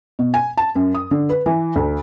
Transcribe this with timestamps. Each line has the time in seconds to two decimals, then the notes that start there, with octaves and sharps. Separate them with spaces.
0.19 B2
0.34 G#5
0.57 A5
0.75 F#2
0.95 D#6
1.11 D3
1.29 B4
1.46 E3
1.75 D2